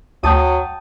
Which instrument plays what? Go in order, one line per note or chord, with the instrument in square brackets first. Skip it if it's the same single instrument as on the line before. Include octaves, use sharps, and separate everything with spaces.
[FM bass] D2 [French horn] F#3 [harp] G5 A5 D#6